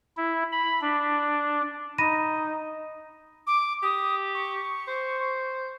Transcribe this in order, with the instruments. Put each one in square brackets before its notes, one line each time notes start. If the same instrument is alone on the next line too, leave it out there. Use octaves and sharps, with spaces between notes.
[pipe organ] E4
B5
D4
[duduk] D#4 [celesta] B5 A#6 D#7
[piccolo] D6
[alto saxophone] G4 [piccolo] D#6
[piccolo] C#6
[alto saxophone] C5